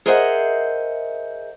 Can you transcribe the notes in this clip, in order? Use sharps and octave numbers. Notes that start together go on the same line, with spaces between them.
G#4 A#4 C5 D#5 E5 F#5